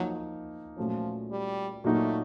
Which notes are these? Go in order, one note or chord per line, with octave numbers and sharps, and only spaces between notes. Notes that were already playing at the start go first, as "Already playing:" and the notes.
Already playing: F3 F#3 A#3 D#4
A#2 F3 F#3 A3 C#4
G3
A#2 F#3 A3 A#3 D#4 F#4